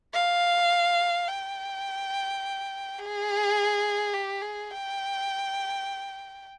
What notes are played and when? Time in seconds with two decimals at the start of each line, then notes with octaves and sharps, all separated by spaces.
0.13 F5
1.28 G5
2.99 G#4
4.14 G4
4.42 G#4
4.71 G5